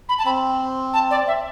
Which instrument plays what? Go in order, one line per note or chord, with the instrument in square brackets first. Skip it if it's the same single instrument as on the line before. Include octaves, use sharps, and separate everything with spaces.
[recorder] B5
A5
[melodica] C4 [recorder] B5
[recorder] A5
D5
E5